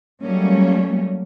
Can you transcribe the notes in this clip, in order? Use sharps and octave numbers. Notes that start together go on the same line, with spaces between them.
F#3 G3 A3 A#3 C#4